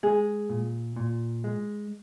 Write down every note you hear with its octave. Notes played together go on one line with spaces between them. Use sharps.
G#3 G#4
A#2
A#2
G#3